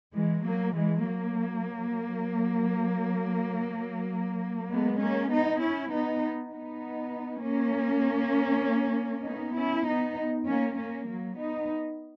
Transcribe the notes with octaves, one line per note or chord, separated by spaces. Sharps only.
E3 G#3
F#3 A#3
E3 G#3
F#3 A#3
G#3 B3
A#3 C#4
B3 D#4
C#4 E4
B3 D#4
B3 D#4
A#3 C#4
B3 D#4
C#4 E4
B3 D#4
A#3 C#4
A#3 C#4
F#3 A#3
B3 D#4